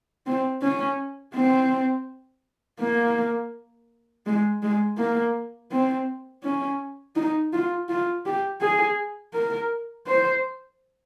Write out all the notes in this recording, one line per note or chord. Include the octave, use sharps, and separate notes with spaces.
C4
C#4
C4
A#3
G#3
G#3
A#3
C4
C#4
D#4
F4
F4
G4
G#4
A#4
C5